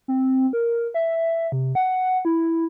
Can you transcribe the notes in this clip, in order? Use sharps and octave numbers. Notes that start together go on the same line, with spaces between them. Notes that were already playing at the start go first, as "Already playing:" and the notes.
C4
A#4
E5
C3
F#5
E4